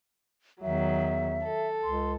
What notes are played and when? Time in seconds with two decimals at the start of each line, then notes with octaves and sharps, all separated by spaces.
0.62 E2 D#3 F#3 E5
1.43 A4
1.84 C#2 C6